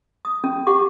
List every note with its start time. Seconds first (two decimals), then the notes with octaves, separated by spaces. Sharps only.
0.25 D#6
0.44 C#4
0.67 G4 F#5 C#6 D6